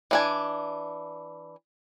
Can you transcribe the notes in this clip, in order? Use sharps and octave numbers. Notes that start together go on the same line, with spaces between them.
E3 D4 G#5